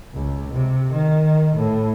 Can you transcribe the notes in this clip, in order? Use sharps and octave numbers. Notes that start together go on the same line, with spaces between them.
C#2
C3
D#3
A2